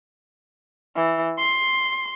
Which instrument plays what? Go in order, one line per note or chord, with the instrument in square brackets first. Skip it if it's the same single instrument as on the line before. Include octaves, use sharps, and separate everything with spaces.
[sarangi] E3
C6